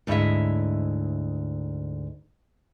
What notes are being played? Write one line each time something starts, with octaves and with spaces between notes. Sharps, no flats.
D2 G#2 E4 C#5 D#5 E5